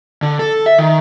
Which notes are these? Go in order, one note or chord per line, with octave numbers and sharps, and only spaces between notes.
D3
A4
E5
D#3